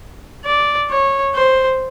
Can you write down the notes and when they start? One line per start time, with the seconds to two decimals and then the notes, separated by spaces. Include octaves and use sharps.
0.46 D5
0.90 C#5
1.35 C5